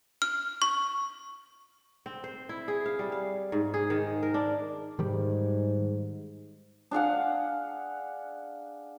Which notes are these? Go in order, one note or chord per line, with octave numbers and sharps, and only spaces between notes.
F6
C#6
C4
C5
E4
G#4
F5
G3
F5
G#2
G#4
D#3
A#4
D4
G#2 D#3 G3
D4 G#4 F5 F#5